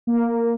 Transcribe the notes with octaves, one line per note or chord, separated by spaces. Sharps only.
A#3